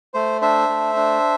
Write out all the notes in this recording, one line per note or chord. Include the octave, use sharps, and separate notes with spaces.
A3 C5
D4 C5 E5
A3
D4